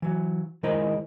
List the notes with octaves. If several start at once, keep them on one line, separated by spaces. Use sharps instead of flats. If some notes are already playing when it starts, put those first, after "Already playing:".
E3 F#3
D#3 G#3 E4 A#4 C5 D#5